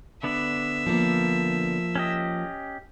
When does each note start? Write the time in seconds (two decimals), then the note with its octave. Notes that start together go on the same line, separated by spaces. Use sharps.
0.23 D3 B3 D4 E5
0.86 F3 A#3
1.95 C#4 G4 D#5